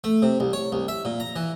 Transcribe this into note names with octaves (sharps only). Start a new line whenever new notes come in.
A3
C3
C2
C#5
C2
E5
A#2
A#5
E3